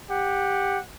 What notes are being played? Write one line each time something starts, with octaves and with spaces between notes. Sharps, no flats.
G4 F#5